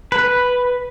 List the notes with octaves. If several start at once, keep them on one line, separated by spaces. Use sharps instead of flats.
B4